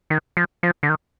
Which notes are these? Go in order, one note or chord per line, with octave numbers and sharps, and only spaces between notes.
D#3
F3
F3
D3
D#3